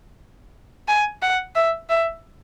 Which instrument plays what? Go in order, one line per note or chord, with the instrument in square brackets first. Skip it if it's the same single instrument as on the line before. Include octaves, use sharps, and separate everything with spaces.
[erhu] G#5
F#5
E5
E5